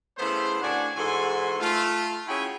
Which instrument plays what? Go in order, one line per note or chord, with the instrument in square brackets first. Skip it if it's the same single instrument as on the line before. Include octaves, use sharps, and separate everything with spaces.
[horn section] C#3 A3 B3 E4 C5
A2 D4 F#4 D5 F#5 G#5
G#2 E3 F#4 A4 G#5 C6
A3 F4
C#4 E4 F#4 G#4 G5